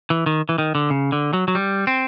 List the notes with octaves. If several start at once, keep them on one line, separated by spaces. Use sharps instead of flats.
E3
D#3
E3
D#3
D3
C#3
D3
F#3
F#3
G3
C4